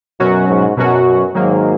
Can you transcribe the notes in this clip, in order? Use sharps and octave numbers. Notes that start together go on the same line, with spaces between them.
F#2 B2 F#3 C#4 F#4
G#2
F#2 B2 F#3 C#4 F#4
G#2 D#3 F#3 A#3